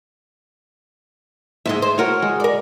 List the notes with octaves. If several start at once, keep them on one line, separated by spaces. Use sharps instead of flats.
G#2 G#3 E5 A5 C6
C5
F#4 A#4 C#5
G#3
A#4 D5